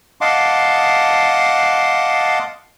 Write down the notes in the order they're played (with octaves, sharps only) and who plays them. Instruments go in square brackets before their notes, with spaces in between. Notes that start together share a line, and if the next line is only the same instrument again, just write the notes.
[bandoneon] D#5 F5 F#5 A5 C6 D6